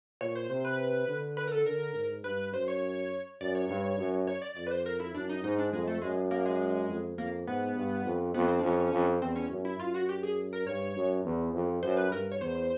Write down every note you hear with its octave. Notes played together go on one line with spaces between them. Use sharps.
A#2 C#5
C5
C3 C5
B4
D3
B4
A#4
A4
D3 A#4
G#2
G2 B4
F#2 C5
C#5
F#2 D5
C#5
G2 C#5
F#2
C#5
D5
F2 D5
B4
C5
A#4
E4
F#2 D4
D#4
G#2 D#4
D4
F2 G#3
A3
F#2 G#3
A#3
G#3
F2
F2 A#3
G#2 B3
G2
F2
F2 B3
C4
D4
F2 C#4
F2
E2 C4
C#4
F#2
E4
F#2 F4
F#4
G4
G#4
A#4
G2 C#5
F#2
E2
F2
F#2 C5
B4
G2 A#4
C#5
E2 C5